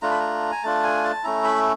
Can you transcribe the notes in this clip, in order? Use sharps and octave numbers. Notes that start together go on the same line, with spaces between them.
A3 D4 F4 A#5
B5
A#5
G#5
A3 D4 F4 A5
G#5
A5
A3 C#4 E4 A#5
B5